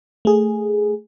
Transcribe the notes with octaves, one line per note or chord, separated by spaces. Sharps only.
A3 G#4